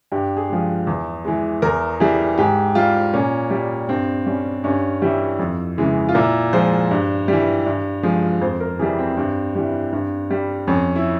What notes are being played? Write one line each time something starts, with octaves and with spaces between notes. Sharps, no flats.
G2 G4
G#4
F3 G#3
E2
E3 G#3
E2 A#4
E3 G3 G#4
G#2 G4
G3 F4
A#2 C#4
G3
G2 C4
G3 C#4
G2 C#4
E3 G3 E4
F2
C#3 E3 G#3
F4
A#2 E4
F3 G#3 C5
G2
E3 G3
G2
F3 G#3
F2 C5
A#4
E3 G3 G#4
C4
G2
E3 G3
G2
G3
F2 C#4
E4